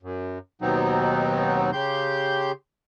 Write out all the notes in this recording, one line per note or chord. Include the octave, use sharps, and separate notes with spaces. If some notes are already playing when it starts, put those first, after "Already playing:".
F#2
D#2 B2 F#3 B3 C4 D#4
C#3 G4 C6 G6